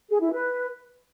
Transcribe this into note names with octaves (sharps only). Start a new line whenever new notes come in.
G#4
E4
B4